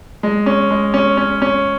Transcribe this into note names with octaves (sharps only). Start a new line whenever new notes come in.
G#3
C#4
G#3
C#4
C#4
C#4